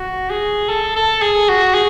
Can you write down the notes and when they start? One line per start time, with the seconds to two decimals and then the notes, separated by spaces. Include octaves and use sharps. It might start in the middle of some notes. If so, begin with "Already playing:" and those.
Already playing: F#4
0.30 G#4
0.69 A4
0.96 A4
1.22 G#4
1.49 F#4
1.74 G#4